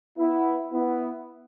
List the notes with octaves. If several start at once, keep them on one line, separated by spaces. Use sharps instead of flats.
B3 E4
B3 E4